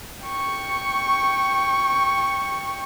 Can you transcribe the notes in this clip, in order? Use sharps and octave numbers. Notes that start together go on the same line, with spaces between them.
G5 C#6